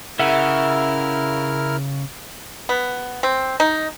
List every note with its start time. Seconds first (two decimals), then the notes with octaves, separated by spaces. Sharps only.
0.19 C#3 E4 A#4 E5 F#5 F6
2.69 B3
3.23 C4
3.60 D#4